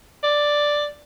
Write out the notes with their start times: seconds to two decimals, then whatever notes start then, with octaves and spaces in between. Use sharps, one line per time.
0.23 D5